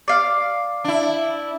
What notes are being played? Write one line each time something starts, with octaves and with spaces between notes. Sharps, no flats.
D5 F5
D4 E4